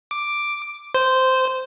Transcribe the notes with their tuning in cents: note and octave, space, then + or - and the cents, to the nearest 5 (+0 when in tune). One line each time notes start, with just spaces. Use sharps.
D6 +5
C5 -10